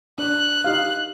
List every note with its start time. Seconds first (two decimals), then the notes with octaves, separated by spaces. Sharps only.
0.18 D4 D5 F#6
0.64 D#4 G4 F5